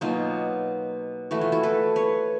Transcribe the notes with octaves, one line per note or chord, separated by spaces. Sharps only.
B2 F#3 A#3 D#4 F4
E3 A3 F#4
F4
E4 F#4
A4 B4
B4 C#5